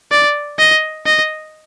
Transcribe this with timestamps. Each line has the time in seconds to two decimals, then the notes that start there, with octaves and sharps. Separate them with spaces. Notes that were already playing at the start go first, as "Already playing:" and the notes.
0.11 D5
0.59 D#5
1.06 D#5